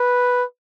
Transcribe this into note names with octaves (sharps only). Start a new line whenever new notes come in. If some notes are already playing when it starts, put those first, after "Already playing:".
Already playing: B4